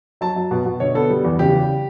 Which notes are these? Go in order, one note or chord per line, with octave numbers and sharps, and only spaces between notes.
F#3 A5
F#3
B2
B2
D3 C#5
B3 A4
G3
E2
C#3 G4
G3